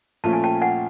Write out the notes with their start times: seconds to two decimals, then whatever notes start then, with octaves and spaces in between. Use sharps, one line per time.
0.24 A#2 F3 A3 C#4 A5
0.33 G#5
0.44 G5 A5
0.61 F#5 G#5